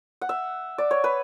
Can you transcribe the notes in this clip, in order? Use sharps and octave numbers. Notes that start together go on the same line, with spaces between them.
F#5
E5
D5
C#5
B4